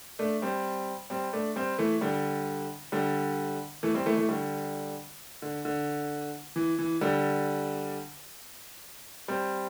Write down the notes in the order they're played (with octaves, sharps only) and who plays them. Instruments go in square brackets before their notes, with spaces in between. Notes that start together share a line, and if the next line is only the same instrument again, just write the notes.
[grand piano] A3 D4
G3 C4
G3 C4
A3 D4
G3 C4
E3 A3
D3 G3
D3 G3
E3 A3
G3 C4
E3 A3
E3 A3
D3 G3
D3
D3
E3
E3
D3 G3
G3 C4